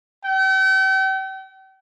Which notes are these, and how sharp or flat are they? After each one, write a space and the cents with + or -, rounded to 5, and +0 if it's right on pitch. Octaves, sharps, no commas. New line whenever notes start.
G5 -40